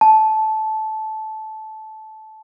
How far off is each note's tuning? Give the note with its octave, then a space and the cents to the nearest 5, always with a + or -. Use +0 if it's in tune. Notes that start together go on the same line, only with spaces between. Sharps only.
A5 -15